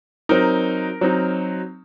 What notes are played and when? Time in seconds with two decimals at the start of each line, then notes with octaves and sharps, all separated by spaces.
0.29 F#3 C4 D#4 A#4
1.01 F#3 C4 D#4